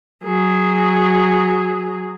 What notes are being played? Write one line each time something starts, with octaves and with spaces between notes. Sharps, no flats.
F#3 G#4